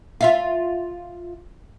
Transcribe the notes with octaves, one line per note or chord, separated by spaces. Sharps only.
F4 E5 F5